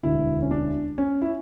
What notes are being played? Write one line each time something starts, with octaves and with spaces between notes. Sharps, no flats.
E1 D2 D3 E4
C#4
D4
C#4
E4